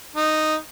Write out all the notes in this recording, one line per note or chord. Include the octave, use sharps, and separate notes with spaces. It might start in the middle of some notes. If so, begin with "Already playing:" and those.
D#4